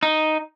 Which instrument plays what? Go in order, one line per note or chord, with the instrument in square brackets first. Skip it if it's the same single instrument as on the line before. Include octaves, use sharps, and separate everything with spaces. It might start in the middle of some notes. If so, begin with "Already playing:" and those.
[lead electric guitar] D#4